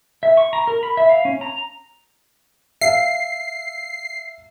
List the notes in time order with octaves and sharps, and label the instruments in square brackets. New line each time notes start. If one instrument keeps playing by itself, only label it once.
[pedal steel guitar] E5
C#6
A#5
A#4
B5
E5
F5
C#4
A#5
[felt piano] E5 F5 [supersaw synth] C7